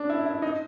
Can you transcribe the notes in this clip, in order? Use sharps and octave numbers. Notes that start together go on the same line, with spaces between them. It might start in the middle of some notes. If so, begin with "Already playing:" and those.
Already playing: D4
E4
E4
D#4